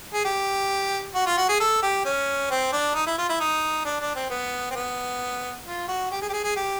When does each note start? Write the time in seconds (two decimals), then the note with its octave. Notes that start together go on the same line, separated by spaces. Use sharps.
0.14 G#4
0.25 G4
1.15 F#4
1.26 F4
1.38 F#4
1.49 G#4
1.60 A4
1.82 G4
2.05 C#4
2.51 C4
2.73 D4
2.95 D#4
3.07 E4
3.18 F4
3.29 E4
3.40 D#4
3.85 D4
4.01 D4
4.15 C4
4.30 B3
4.71 C4
4.75 B3
5.66 F4
5.88 F#4
6.11 G4
6.22 G#4
6.29 G4
6.33 G#4
6.44 G#4
6.56 G4